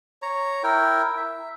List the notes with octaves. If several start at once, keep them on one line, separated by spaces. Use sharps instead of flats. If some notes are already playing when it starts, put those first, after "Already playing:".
C#5 A#5
E4 A#4 G5
E5